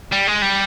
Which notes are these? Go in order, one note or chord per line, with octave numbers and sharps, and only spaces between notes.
G3
G#3
G3